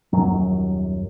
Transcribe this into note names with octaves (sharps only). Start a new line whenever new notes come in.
D#1 F#2 F#3